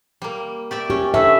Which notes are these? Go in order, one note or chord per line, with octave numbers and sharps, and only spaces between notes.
G3 A#3
G4 D5 E5
C#4 G4
D3 C#4 B4 E5